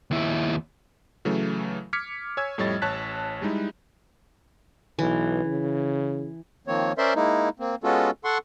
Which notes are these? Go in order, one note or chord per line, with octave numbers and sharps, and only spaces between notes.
D#2 E4
C#3 E3 F#3 A3
D6 F6 G#6 B6 C#7
C#5 G#5 E6 G#6
F2 A2 G3 C#5 D#5 A6
A1 C#5 A5 F#6 B6
G3 G#3 D#4 E4
B1 E3
C#3
D#3 F3 A#3 C4 C#5
C#4 A#4 C5 D5 E5 C6
G#3 A#3 D#4 E4
A#3 C4
G#3 B3 C#4 F4 F#4 A4
A4 F#5 C6 C#6